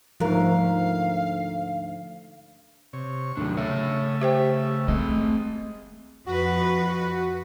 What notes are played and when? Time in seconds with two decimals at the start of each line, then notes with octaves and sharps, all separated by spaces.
0.20 D2 G#2 F3 A#4 F5
2.93 C3 C#5
3.37 D#2 A2 F#3 D4
3.57 C#3 A3 C#5 E5
4.21 G4 C5 E5 G5
4.88 G#3 A3 C4 D#5
6.26 F2 F#4 B4